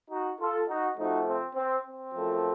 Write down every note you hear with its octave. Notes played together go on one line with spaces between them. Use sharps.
D#4 F#4
F4 A4
D#4 F#4
C3 F3 A3 C4 D#4 F#4
C4
C4
C4
F#2 F3 A3